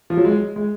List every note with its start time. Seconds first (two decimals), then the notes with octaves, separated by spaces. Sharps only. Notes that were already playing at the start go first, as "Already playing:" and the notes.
0.10 F3
0.17 F#3
0.25 G#3
0.56 G#3